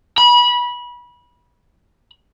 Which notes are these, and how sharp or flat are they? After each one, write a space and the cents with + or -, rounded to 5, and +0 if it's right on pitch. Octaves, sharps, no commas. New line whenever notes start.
B5 -25